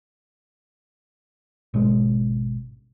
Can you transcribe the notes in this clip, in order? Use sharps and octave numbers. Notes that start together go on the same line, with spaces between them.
G#1 B2 G#3